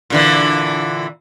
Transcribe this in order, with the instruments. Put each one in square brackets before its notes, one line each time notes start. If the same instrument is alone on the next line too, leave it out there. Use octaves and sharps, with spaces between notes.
[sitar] A#2 D3 E3